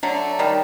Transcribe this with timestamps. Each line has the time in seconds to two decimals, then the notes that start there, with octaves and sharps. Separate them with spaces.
0.03 D3 F#3 A3
0.39 D#3 G3